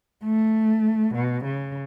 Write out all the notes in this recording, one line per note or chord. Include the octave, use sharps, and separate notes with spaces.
A3
B2
C#3